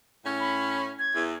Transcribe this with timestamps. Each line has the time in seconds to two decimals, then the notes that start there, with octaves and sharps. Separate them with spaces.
0.25 A2 C#4
0.40 B5
0.99 G#6
1.14 E2